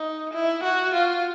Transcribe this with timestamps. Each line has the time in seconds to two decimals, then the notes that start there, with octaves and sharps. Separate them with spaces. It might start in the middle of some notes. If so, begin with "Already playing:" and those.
Already playing: D#4
0.33 E4
0.63 F#4
0.94 F4